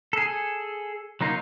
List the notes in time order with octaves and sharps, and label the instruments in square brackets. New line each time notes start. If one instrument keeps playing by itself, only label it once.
[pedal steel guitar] G#4 A4
F#3 A#3 D#4 F4